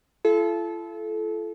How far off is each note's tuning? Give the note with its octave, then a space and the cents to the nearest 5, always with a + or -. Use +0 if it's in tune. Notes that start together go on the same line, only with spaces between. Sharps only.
F4 -45 A4 -25